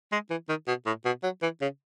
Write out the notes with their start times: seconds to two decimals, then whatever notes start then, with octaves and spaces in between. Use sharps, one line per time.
0.12 G#3
0.30 E3
0.49 D#3
0.68 B2
0.86 A2
1.05 B2
1.23 F#3
1.42 E3
1.61 C#3